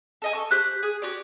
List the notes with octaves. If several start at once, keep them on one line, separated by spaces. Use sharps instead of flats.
A4 D#5 G#5
A4 C#6
G4 C5 F#6
G#4
F#4 G4 D5